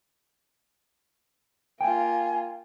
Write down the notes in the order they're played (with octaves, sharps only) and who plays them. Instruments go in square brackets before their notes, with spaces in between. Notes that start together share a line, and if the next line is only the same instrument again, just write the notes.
[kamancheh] A#3 F4 [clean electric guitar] G5 [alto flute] G#5